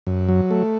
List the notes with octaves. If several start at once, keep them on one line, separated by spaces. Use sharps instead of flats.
F#2
F#3
A3